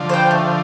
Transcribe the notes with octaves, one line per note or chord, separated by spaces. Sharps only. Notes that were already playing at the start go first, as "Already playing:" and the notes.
Already playing: D3 F3
C5 G5
A3